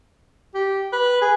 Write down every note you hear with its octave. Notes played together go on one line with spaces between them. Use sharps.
G4
B4
G#4